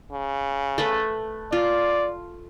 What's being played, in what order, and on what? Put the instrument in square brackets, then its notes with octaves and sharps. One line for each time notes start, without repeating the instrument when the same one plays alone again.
[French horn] C#3
[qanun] A3 B4
[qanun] F4 [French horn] D5